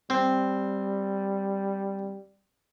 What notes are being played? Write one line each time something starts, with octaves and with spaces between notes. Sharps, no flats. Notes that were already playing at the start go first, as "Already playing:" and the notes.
G3 C4